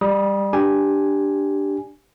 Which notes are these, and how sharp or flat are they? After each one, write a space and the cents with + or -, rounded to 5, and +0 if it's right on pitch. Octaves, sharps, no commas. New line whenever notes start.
G3 +20 B5 -40 D#6 +0
D4 +0 G4 +0 G#5 +0